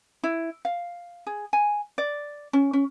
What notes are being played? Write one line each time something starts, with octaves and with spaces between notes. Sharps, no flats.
E4
F5
G#4
G#5
D5
C#4
C#4